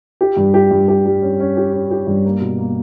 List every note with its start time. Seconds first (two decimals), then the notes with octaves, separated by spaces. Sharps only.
0.21 G4
0.37 G2
0.54 G4
0.71 G2
0.88 G4
1.06 G3
1.22 C#4
1.40 C#4
1.57 G4
1.73 C#4
1.91 G4
2.07 G2
2.25 A#3
2.41 B2
2.58 A#3